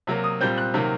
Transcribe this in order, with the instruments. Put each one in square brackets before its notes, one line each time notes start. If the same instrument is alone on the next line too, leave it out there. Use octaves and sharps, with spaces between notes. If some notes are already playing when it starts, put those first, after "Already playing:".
[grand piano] C3 F#3 A#3
D#6
A#2 G3 C4 G6
F#6
C3 D#3 F#3 A#3